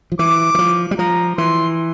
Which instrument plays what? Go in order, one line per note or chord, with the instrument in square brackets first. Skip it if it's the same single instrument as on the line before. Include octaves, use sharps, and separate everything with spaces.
[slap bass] F3
[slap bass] E3 [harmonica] D6
[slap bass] E3
F3
G3
[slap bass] F3 [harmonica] A#5
[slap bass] E3 [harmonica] C6